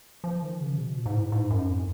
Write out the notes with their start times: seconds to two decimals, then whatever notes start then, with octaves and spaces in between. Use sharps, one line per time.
0.24 F3
0.42 D#3
0.61 C#3
0.78 B2
0.97 A#2
1.06 G#2
1.14 A2
1.32 G#2
1.51 F#2
1.68 F2